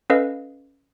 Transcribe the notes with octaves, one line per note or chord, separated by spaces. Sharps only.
C#4 A4 B4 D#5 F5